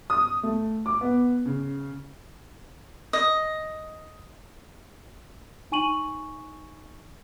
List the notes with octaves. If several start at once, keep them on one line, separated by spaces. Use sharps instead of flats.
D#6
A3
D6
B3
C#3
D#5
D#4 G#5 C#6 D#7 F#7